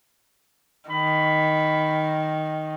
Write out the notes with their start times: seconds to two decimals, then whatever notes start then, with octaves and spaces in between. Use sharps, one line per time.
0.90 D#3 B5